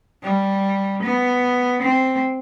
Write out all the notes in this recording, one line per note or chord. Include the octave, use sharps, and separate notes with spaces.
G3
B3
C4